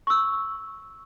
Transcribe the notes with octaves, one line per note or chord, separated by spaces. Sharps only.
C#6 E6